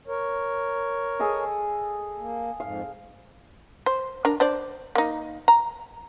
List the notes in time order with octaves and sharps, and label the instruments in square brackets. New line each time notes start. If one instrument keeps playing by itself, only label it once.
[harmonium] A#4 C#5
[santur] G#4 A4 D#5
[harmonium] A#3
[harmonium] F2 G#2 [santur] F5
[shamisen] C5
D4 A#4
D4 C5 D5
A#3 D#4
A#5